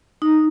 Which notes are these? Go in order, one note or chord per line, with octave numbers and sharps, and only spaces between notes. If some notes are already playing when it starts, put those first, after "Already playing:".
D#4